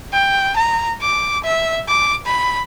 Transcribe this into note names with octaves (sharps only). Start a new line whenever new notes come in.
G5
A#5
D6
E5
D6
B5